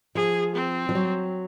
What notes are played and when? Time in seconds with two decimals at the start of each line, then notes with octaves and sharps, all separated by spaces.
0.15 F3 G#4
0.55 C4
0.89 F3
0.95 F#3